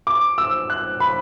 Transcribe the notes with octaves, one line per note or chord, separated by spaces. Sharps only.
D6
E6
F#6
B5